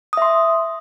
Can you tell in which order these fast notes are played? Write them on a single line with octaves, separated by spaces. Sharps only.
D#6 E5 C6